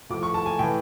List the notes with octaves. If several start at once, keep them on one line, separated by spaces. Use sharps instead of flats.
A2 F3 D6
C#6
A5
G#5
A2 E3 G5